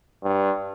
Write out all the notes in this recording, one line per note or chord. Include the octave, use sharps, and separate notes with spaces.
G2